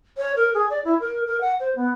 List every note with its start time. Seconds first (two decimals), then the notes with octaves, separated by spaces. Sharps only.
0.17 C#5
0.36 A#4
0.54 G#4
0.70 D5
0.85 E4
1.00 A#4
1.27 A#4
1.41 F#5
1.60 C5
1.76 B3